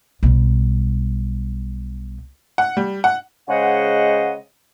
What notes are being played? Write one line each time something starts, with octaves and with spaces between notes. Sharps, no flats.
B1 G3
F#5
G3
F#5
C#3 G#3 C5 D#5 F#5